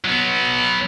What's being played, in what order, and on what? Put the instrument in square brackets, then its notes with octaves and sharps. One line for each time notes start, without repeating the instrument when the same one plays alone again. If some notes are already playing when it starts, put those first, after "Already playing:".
[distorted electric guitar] F#3 B3